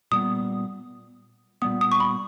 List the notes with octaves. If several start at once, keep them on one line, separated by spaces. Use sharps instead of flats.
A#2 G3 B3 D#6
A#2 G3 B3 D#6
D#6
C#6
B5